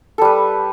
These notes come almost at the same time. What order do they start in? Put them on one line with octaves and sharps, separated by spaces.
A4 G3 B4